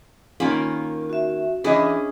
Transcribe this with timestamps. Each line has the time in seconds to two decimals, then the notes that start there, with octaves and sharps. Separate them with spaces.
0.40 D#3 A#3 C#4 F4 B5
1.10 F#4 E5
1.64 E3 C#4 D4 E4 G#4 D#5